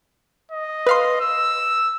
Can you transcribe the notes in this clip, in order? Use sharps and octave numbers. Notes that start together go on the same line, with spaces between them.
D#5
B4 F5 C6
E6